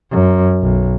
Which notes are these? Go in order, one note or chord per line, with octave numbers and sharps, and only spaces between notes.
F#2
B1